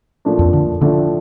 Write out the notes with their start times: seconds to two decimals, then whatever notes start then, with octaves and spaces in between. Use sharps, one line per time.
0.25 A#2 F3 A3 D4
0.39 F2
0.53 D3
0.81 A2 D3 F3 A3 D4 A4